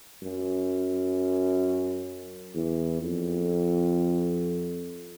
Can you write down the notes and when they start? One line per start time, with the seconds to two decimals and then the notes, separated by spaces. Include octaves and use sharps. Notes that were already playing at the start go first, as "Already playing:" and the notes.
0.23 F#2
2.55 E2
3.02 F2